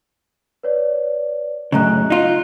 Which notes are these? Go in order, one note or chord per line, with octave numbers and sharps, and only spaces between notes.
B4 C#5 D5
F#2 A2 C#3 D#5 A#5 F#6
D#4 F4